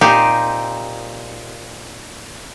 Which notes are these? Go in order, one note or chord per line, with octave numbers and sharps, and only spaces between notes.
A#2 C4 D#4 G4 G#5